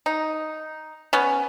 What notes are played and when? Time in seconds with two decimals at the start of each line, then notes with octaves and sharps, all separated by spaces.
0.06 D#4
1.13 B3 C#4